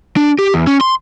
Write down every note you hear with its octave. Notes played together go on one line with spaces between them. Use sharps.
D4
G4
E2
C#4
C6